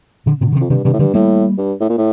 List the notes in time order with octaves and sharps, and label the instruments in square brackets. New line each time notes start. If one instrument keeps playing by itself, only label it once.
[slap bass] A#2 D3
A2 C3
D3
C3 D#3
[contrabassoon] F2
[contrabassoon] G2 [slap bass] C3 D#3
[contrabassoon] G2 [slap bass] C3 D#3
[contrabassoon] A2
[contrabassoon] G2 [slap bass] D3 F3
[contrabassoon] A2 [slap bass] G3 A#3
[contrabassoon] G2
A2
A#2
A2